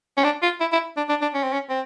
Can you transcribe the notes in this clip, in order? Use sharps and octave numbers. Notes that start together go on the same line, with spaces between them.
C#4
D4
F4
E4
E4
D4
D4
D4
C#4
C4
C#4
C4